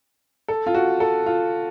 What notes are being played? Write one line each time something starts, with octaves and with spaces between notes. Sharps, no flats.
A4
F4
F#4
A4
F4